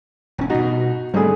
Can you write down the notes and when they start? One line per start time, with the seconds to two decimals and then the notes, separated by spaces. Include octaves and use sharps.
0.38 E1 C#4
0.50 G2 B2 D#4 F#4
1.14 G#1 D3 G3 A3 G#4